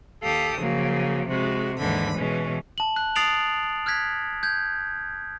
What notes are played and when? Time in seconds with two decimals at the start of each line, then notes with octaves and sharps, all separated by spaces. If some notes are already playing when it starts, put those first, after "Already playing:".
0.22 D#2 G4 A4 F5 D#6
0.58 C#3 F3 F#3 A#3
1.29 C3 G#3 F#4
1.79 D#2 G#2 D3 E3 B5
2.17 B2 E3 G#3 C#4
2.78 A5 F#7
2.96 F#6
3.16 D#6 A6 C7 D7 F7 F#7
3.86 F6 F#6 G#6 B6
4.43 G6 G#6